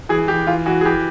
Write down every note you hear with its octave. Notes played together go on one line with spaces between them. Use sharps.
E3 G#4
E3 G4
E3 F4
E3 F#4
G#4
E3 G4